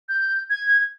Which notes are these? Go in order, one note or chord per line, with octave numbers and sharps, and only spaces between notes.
G6
G#6